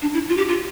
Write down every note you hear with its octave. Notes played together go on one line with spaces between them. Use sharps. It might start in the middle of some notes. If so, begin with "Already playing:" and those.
D4
E4
F4
G4
F4